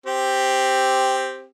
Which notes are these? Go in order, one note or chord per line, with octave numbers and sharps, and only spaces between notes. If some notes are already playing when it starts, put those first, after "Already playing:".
C4 G4